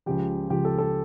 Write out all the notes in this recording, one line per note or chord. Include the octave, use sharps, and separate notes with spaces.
C#2 C#3 F3 G4
C#2 C#3 F3 G4
A4
A4